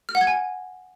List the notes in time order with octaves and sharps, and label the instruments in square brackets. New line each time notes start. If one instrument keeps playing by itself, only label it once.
[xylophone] F6
F#5
G#6
G#5